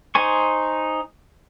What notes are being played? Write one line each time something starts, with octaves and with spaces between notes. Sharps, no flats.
D#4 C5 G#5 C#6